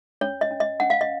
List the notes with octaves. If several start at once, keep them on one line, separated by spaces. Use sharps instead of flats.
C#4 C#5
D#5
C#4
D#5
C#4 F#5
F5
D#5